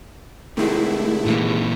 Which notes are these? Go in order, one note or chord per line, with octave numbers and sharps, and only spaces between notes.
C3 D#3 G#3 A3 E4
A#2 E3